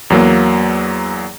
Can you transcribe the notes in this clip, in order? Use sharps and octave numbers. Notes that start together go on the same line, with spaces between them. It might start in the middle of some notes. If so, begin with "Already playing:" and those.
E2 F#3 A#3